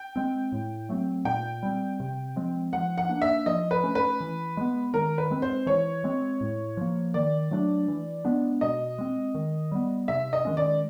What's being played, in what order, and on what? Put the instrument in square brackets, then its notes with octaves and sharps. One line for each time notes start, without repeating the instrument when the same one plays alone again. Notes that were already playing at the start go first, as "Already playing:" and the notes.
Already playing: [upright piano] G5
[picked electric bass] G#3 C4
A2
F#3 A3 C4
[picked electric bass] A#2 [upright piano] G5
[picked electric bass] G3 C4
C3
F3 G#3 C4
[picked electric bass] F3 [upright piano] F#5
[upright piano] F#5
[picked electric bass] A#3 D4
[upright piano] E5
[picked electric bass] F3 [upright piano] D#5
[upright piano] B4
[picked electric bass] A3 C#4
[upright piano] B4
[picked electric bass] E3
G#3 B3
[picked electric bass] D#3 [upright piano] A#4
[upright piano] B4
[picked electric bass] G#3 C4
[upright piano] C5
[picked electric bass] E3 [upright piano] C#5
[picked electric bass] G#3 C4
A2
F3 A#3
[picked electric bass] D#3 [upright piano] D5
[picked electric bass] F#3 A3 D4
E3
G#3 B3 D4
[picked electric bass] B2 [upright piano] D#5
[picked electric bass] G#3 C4
D#3
G3 B3
[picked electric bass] C3 [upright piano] E5
[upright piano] D#5
[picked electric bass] D#3 G#3 C#4
[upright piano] D5